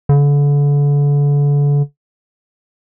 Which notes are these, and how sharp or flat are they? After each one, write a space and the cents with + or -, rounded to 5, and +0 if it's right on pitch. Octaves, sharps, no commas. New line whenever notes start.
D3 -35